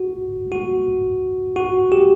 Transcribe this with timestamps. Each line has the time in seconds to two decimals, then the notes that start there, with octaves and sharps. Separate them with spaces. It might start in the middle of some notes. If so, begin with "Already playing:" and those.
Already playing: F#4
0.52 F#4
1.56 F#4
1.92 G4